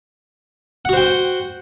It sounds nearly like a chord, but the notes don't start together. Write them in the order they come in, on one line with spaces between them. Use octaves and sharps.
F#5 F#4 C5 G5